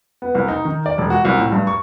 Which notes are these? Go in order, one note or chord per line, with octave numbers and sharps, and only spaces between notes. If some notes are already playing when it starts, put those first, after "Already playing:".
B3
C2
D#4
D#3
D5
E1
F#4
C2
A2
G2
C#6